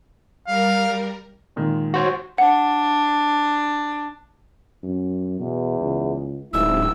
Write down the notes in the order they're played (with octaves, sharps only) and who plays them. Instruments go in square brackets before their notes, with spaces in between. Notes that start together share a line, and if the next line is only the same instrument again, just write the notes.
[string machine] G3 A#4 [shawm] F5
[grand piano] A#2 D#3 G#3
[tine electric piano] F#4 C5 C#5
[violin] D4 [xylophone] F#5
[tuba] F#2
[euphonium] E2 [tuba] B2
[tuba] C#2
[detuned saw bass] D1 [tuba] G#2 [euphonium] E4 [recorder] E6